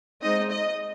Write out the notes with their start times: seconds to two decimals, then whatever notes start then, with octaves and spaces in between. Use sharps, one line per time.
0.21 G#3 C4 D#4 D#5
0.50 D#5